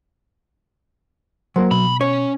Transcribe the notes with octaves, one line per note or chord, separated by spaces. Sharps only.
F#3 A#3 A#4 C5
B2 B5
C#4 C#5